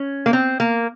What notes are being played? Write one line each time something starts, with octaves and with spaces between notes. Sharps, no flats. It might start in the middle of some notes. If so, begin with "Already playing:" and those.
Already playing: C#4
A#3
C4
A#3